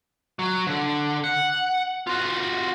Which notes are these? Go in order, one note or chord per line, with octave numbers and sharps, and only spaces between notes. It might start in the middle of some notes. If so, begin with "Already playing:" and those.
F#3
D3
F#5
F4 F#4